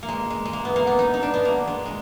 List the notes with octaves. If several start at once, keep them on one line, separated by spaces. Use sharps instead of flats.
A#3
G#3
G#3
G#3
A#3
B3
A#3
B3
D#4
D#4
D4
B3
A#3
G#3
G#3